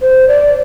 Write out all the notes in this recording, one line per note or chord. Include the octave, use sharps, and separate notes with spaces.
C5
D5